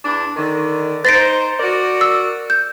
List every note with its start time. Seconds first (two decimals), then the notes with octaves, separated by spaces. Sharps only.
0.04 E2 D4
0.36 D3 D#3
1.05 D#4 C5 A6 A#6 D7
1.59 F#4 A#4 D5
2.01 E6
2.50 G6